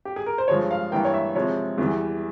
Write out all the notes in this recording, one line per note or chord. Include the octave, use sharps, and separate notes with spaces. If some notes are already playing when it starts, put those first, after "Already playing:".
G4
G#4
A#4
C5
G2 F3 G#3 C#5
F5
G2 E3 A#3 G5
C#5
E5
C3 F3 G#3 C#5
E2 E3 G3